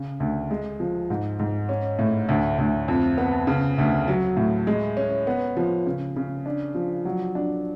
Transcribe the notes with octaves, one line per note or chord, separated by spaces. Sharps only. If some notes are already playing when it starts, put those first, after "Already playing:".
Already playing: C#3
D2
G#3
F3
G#2
G#2
C#4
A2
D2
D2
F2
B3
C#3
D2
F#3
A2
G#3
C#4
B3
F3
C#3
C#3
D4
F3
F#3
D4